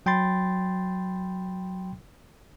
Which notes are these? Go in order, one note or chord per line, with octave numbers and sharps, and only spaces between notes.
F#3 G5 B5 C6 A6